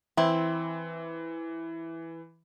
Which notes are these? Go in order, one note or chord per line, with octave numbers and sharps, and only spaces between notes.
E3 C4 E4